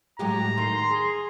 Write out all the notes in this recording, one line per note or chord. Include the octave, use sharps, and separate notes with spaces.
A2 F#3 G#3 G4 A#5
D#3 C6
G#4